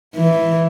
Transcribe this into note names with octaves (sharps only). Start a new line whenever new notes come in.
E3